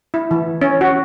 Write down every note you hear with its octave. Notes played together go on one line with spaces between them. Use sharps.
E4
E3
C#4
F#4